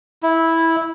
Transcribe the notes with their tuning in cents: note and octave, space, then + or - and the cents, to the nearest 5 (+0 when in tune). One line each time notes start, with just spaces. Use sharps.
E4 -10